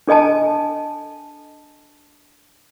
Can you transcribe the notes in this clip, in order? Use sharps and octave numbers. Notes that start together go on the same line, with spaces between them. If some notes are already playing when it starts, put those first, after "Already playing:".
D4 A4 D#5 G#5 A5